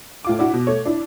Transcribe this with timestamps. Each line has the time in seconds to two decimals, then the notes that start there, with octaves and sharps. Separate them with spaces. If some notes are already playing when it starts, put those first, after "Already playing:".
0.25 A2 F4 D6
0.39 D4 E4 F#4
0.54 B2
0.67 A3 C#5
0.86 D4 E4